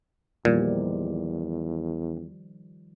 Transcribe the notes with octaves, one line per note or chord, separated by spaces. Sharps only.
E2 A#2 D#3 F3 G3